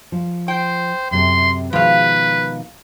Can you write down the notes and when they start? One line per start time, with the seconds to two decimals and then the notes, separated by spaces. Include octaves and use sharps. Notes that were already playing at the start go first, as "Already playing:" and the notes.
0.12 F3
0.48 C5 G5
1.11 F#2 C3 A4 C6
1.73 B2 D#3 F3 G#3 B4 F5